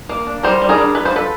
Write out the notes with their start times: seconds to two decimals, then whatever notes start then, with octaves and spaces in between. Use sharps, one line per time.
0.09 A#3
0.27 D4
0.43 G3 A#4 C5
0.62 G3
0.69 G#4 A#4
0.78 D4
0.95 F4 B4
1.05 C5
1.12 D4
1.16 A4 B4